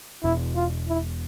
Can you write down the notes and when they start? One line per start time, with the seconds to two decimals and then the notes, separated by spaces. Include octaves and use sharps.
0.23 E1 E2 B2 E4
0.56 F4
0.88 E4